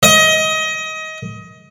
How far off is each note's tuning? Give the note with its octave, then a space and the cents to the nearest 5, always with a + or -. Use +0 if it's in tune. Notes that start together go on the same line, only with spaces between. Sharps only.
D#5 +25